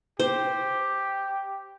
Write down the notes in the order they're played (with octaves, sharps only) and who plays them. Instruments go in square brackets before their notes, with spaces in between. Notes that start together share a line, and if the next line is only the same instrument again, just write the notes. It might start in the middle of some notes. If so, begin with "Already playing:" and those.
[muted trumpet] G4 [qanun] C5